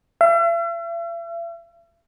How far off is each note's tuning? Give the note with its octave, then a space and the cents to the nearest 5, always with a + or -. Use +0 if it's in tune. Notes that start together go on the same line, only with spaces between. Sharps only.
E5 +45